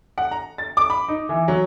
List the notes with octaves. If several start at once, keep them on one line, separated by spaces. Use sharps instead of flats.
F#5
A#5
A6
D6
B5
D#4
E3
F#3